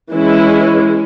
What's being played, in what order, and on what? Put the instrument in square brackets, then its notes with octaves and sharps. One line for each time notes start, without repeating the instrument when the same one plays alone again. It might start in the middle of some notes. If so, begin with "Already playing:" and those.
[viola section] E3 G#3 C#4 E4